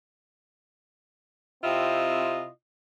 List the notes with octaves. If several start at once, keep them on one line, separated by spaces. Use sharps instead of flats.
C3 C4 E4 F4 D#5